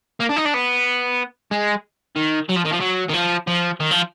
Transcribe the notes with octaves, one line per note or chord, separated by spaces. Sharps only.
A#3
D4
D#4
D4
B3
G#3
D#3
F#3
F3
D#3
F3
F#3
D#3
F3
F3
D#3
F3